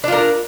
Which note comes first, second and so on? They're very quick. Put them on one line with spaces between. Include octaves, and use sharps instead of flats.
D4 F4 A#4